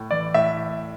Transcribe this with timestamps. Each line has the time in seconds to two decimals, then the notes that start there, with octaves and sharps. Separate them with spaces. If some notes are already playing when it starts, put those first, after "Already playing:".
Already playing: A2
0.11 E3 D5
0.34 A2 E5